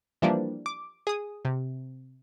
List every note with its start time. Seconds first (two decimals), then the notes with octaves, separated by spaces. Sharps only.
0.22 E3 F3 G3 A#3 D4
0.66 D6
1.07 G#4 D#6
1.45 C3